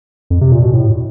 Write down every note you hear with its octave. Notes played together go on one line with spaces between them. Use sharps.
F2
C3
A#2
B2
A2